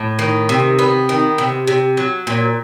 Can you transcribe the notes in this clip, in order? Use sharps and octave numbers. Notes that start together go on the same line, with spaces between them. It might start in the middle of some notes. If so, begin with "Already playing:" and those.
Already playing: A2
D#3
C3
B3
D#3
C3
C3
F#3
A#2